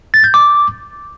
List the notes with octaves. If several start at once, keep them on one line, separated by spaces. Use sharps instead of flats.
A6
G6
D6